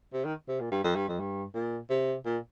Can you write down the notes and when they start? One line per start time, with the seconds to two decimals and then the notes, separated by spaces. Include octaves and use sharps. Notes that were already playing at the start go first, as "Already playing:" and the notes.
0.13 C3
0.25 D#3
0.48 C3
0.60 A#2
0.72 G2
0.84 F2
0.96 G2
1.08 F2
1.20 G2
1.54 A#2
1.90 C3
2.26 A#2